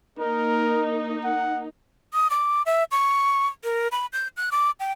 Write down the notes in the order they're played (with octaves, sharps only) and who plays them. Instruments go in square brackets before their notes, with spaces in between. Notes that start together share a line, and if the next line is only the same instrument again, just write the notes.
[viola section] A#3 D#4 [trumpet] A#4
[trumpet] F#5
[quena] D#6
D6
E5
C#6
A#4
B5
G6
F#6
D6
G5